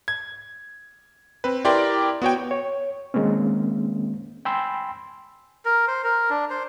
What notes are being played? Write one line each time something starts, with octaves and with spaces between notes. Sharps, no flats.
G#6
C4 B4
E4 G4 A#4 D5 G5 C6
B3 F#4 C#5 G5
C#5
D#3 G#3 A#3 C4 C#4
G5 G#5 B5 C6 E6
A#4
C5
A#4
D4
C5